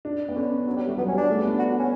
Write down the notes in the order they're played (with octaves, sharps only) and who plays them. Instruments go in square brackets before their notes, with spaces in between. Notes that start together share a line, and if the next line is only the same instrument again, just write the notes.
[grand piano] D4
B3
[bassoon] D3 [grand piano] C#4
[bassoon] F#3
G3
[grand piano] G3 [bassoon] A3
[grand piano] F#3 [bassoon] B3
[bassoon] C#4
[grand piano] G3 [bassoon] D4
[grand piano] A3
B3
D4
[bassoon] F#4
C#4